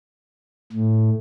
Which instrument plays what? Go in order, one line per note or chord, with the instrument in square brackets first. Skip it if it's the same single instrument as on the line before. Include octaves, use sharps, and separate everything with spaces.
[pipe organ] A2